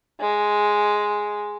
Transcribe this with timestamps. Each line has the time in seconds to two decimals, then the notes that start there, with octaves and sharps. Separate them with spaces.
0.21 G#3